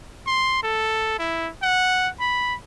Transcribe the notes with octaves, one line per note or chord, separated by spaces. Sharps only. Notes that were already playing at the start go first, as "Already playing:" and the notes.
C6
A4
E4
F#5
B5